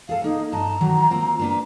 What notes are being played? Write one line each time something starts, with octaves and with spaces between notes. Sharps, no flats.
G#4 A4 F5
A#3 D#4
G2 D#5 A5 A#5
D#3 E3 F#3
A#3 C4 F4
A#3 D4 B4